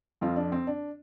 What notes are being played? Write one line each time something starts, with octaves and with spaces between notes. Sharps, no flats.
F2 F3 C4 F4
D4
C4
D4